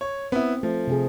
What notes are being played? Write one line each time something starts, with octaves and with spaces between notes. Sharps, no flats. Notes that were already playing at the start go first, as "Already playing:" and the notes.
C#5
B3 C4 E4
F3 A3
C3 C4 G#4